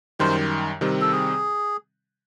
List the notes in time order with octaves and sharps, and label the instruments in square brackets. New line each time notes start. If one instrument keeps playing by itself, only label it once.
[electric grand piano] F#2 D#3 G3 [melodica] C5
[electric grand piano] C3 D#3 G3 C4
[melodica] A4
G#4